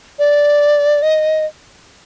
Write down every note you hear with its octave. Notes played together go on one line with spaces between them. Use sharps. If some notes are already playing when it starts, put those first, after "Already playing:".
D5
D#5